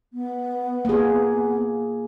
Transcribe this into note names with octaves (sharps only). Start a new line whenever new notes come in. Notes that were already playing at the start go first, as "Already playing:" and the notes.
B3
A#3 G#4